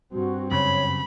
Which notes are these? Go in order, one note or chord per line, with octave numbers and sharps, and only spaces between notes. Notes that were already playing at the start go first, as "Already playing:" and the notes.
G2 C4 F#4
F#2 C#3 C#5 B5